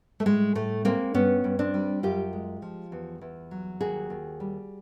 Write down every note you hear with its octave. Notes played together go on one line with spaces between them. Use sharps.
A3
A2 G#3
A2 A3
G#3 A#3 C4
G2 B3 C#4
G2
C4 D4
G3
F#2 F4 G4
G#3
F3
E2
E2
F#3
D#2 F#4 G#4
D#2
G3